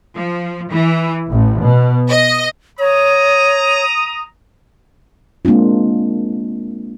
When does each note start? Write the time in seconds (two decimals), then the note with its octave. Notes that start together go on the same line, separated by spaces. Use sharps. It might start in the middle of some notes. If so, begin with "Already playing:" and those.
0.15 F3
0.70 E3
1.31 A1
1.61 B2
2.09 D#5
2.79 C#5 A#5 D#6
5.45 G#3 A#3 C4 D4 F4